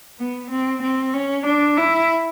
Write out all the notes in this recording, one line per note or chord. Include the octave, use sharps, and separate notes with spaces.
B3
C4
C4
C#4
D4
E4